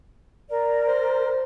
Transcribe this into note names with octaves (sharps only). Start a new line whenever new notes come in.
A#4 D5
C5